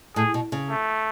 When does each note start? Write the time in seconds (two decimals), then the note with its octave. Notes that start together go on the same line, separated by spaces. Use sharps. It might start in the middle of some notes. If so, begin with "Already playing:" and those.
0.16 A2 G#4
0.34 B2
0.52 C#3
0.70 A3